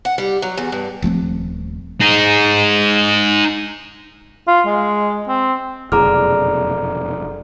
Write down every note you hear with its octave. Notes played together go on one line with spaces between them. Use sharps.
F#5
G3
F#3
E2
G2
D#1 F3 A3 C4
D#4 G#4
F4
G#3
C4
F1 F#2 B2 D3 G#4 A#5 D6 F6